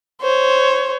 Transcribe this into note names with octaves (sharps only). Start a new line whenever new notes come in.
C5 C#5